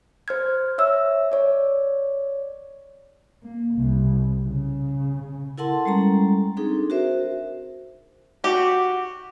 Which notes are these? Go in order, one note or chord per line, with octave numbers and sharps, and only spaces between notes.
C5 F6 G#6
C#5 E5 E6
C#5 D5
A#3
C2
C#3
E4 A4 A#4 F#5 A5 C6
G3 G#3 C#4 A4 A#5
C4 D4 D#4 G#4 A4
F#4 A#4 C5 E5
F#4 G4